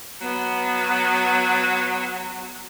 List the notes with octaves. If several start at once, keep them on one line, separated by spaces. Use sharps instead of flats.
F#3 B3